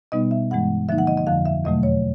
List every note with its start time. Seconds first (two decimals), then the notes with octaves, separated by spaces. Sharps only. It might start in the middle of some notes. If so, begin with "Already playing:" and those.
0.12 B2 G3 B3 D#4 D#5
0.31 E5
0.51 G2 E3 G#3 F#5
0.89 D3 F3 A#3 D#4 E5
0.98 F#5
1.07 D#5
1.17 D#5
1.27 F2 D3 F3 F5
1.45 E5
1.64 E2 B2 F#3 A3 D#5
1.83 C#5